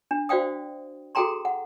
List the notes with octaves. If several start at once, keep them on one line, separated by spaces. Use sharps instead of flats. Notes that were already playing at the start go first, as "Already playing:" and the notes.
D4
F#4 C5 D5 F5 G5 D#6
F#4 G#4 A4 G5 A#5 C6
F#5